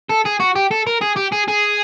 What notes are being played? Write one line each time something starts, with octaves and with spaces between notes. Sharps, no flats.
A4
G#4
F#4
G4
A4
A#4
G#4
G4
G#4
G#4